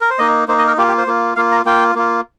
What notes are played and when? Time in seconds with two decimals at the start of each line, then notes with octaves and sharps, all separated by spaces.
0.01 A#4
0.10 C5
0.19 A#3 D#4 D#5
0.48 A#3 D#4 C5
0.58 D#5
0.67 A#4
0.77 A#3 F4 G4
0.88 G4
0.98 C5
1.07 A#3 F4
1.36 A#3 F4 F5
1.51 A#5
1.65 A#3 F4 G5
1.95 A#3 F4